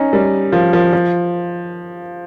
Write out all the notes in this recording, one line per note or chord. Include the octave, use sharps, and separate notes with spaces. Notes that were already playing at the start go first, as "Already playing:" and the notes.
Already playing: C#4 D#4
G3
F3
F3
F3